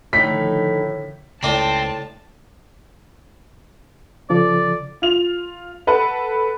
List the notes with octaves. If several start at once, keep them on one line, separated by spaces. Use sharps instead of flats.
A2 D3 D#3 F3 A3 D#4 B6
C#2 A2 C4 D5 A5 A#5
C#3 F3 A4 D5
F4 F7
A4 B4 F#5 A5